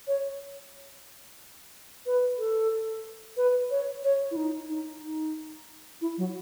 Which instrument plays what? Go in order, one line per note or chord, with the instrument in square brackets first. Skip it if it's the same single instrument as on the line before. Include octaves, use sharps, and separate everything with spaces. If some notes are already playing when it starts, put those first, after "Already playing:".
[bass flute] C#5
B4
A4
B4
C#5
C#5
E4
D#4
D#4
D#4
E4
F#3